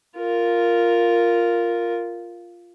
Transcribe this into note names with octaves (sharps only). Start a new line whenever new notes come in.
F4 A#4